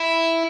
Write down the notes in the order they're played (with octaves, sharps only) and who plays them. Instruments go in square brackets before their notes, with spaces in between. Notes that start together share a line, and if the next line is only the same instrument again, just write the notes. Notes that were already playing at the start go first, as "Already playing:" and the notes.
Already playing: [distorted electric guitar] E4